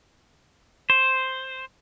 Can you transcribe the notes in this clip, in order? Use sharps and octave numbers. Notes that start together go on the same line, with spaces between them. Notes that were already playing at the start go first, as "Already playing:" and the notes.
C5